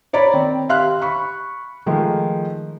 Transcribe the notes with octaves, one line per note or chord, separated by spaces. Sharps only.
C#5 D5 A#5 B5
D#3 C4
G4 E5 F5 C6 F6 F#6
B5 C#6
D#3 F3 G#3 A3